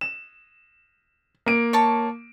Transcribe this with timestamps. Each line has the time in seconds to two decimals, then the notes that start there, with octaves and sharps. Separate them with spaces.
0.01 E7
1.46 A#3 D7
1.73 C#5 A5 C#6